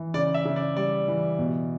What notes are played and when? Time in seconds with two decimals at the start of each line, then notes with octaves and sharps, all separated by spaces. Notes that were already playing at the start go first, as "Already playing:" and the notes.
Already playing: E3
0.14 C#3 D5
0.34 E5
0.45 C#3
0.56 D5
0.76 G3 D5
1.08 E3
1.39 B2